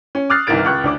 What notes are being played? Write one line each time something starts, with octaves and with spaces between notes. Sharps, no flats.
C#4
D6 D#6 F6 F#6 A6 C7
G1 C2 D#3 A#4 A6 D7
C#2 C#6 F#6
D2 D4 D6